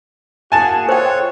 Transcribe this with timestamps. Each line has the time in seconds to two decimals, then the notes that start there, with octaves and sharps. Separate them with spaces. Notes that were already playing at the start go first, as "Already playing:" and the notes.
0.52 A#3 F#4 G#4 G#5 A5
0.89 F4 A4 C5 C#5 G5